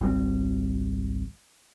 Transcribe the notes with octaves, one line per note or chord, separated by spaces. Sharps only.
G#1 C#2 G3 C4